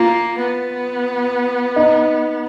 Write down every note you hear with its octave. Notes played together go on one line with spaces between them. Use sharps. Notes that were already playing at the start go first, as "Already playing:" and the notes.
Already playing: A#3 F4
B3
D#4